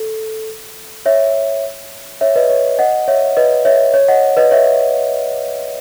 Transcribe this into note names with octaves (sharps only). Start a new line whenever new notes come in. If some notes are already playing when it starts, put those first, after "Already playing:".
Already playing: A4
C#5 E5
C#5 E5
B4 D#5
C#5
D#5 F#5
C#5 E5
B4 D#5
C#5 E5
C#5
D#5 F#5
B4 D#5
C#5 E5